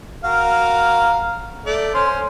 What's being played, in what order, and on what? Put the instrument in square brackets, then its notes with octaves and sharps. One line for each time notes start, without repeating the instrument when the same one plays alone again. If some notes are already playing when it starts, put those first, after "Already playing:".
[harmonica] F#4 A#4 F5
A3 D5
C#4 C5 C6